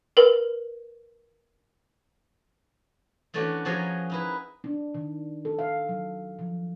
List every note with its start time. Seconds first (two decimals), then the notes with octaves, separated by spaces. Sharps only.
0.17 A#4 B4
3.34 E3 A3 C#4 D4 F#4
3.65 F3 F#4 G#4 A#4 C#5 D#5
4.10 D#4 E4 B4
4.64 D4
4.95 D#3
5.45 A4
5.59 F5
5.89 F#3
6.39 F3